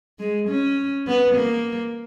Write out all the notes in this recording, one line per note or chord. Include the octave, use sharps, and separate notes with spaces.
G#3
C#4
B3
A#3